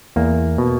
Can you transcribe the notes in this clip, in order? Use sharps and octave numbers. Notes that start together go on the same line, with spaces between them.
E2 A#3
B2